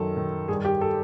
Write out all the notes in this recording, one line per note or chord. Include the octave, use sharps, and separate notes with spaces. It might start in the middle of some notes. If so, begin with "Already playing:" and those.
Already playing: F#2 D#3 A4
D#3
G2 G#4
G4
A4